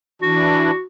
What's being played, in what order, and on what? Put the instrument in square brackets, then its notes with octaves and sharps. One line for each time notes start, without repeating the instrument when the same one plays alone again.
[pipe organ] E3 D4 [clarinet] F#4